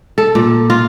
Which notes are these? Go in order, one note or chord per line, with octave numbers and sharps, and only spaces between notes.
A4
A#2
F4